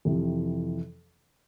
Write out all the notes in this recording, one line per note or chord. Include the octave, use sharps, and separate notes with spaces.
F2 C3 E3